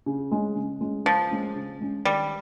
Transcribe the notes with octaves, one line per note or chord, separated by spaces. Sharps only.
C#3
G#3 C#4
C#3
G#3 C#4
C#3 F3
G#3 C#4
C#3
G#3 C#4
D#3 G3